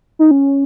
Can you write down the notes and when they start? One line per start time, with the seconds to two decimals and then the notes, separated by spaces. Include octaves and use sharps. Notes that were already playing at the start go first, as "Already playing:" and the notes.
0.19 D#4
0.31 C#4